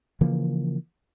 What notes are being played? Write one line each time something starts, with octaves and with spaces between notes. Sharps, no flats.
C#3 E3 F3 A#3